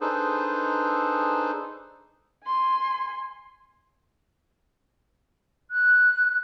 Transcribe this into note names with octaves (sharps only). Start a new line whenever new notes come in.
D4 D#4 G#4 A4 B4 C5
G#5 C6
F#6